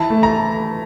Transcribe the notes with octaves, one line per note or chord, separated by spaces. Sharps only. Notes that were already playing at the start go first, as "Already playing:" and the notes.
Already playing: E3 E4 A5
A3
A#5